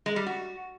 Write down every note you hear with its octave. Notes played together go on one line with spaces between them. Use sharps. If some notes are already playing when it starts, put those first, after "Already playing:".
G#3
G3
F#4